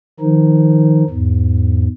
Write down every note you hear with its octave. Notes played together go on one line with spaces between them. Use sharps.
D#3 F3 D#4
E2 G#2